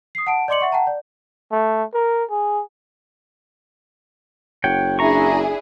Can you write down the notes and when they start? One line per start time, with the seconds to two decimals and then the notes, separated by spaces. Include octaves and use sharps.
0.15 D#6 C7
0.27 F#5 A5 D7
0.48 D5 D#5 C6 D6 C#7 F#7
0.61 E5 F#5 C#6
0.72 F#5 G5 A5 A#5
0.87 D5
1.52 A3
1.94 A#4
2.30 G#4
4.64 F#1 C#5 F#5 G5
4.99 D4 E4 G#4 A#5 C#6